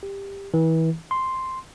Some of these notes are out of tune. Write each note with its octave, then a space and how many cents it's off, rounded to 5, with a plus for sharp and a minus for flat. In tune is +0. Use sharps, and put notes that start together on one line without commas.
G4 +15
E3 -30
C6 +0